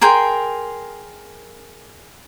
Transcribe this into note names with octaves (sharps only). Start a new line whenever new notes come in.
G#4 A#4 G5 C6